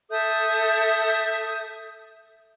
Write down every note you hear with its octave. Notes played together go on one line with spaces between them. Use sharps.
A4 E5 D#6 G6